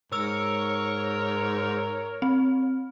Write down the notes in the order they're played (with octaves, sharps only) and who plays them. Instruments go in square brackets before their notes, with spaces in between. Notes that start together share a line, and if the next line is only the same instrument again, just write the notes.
[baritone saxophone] G#2 [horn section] A#4 [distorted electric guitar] C#5 [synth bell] E6
[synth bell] C4